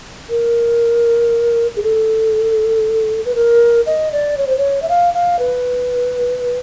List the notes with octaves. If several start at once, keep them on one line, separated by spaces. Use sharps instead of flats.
A#4
G#4
A4
B4
A#4
D#5
D5
C#5
C5
C#5
E5
F5
F5
B4